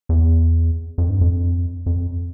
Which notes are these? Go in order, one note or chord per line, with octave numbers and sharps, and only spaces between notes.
E2
F2
G2
F2
F2